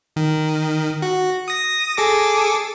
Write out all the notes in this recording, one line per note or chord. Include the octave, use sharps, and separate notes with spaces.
D#3
F#4
D#6 A#6
G#4 A4 D6